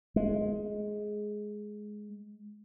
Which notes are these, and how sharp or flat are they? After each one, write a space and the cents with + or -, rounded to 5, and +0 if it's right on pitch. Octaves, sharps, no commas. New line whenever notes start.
G#3 +10